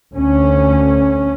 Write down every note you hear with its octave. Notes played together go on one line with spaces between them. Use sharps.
D2 C#4